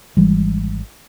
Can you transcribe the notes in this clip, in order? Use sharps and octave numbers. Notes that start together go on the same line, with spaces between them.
G#1 E3 G3 G#3